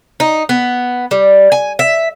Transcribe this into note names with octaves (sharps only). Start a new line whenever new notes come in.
D#4
B3
G3
G#5
E5